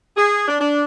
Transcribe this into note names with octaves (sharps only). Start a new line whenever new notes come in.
G#4
D4
D4